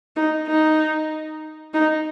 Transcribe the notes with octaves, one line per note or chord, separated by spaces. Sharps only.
D#4
D#4
D#4